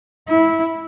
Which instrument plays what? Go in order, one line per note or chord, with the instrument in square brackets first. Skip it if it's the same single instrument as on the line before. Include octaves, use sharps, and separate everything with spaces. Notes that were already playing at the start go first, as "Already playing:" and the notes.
[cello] E4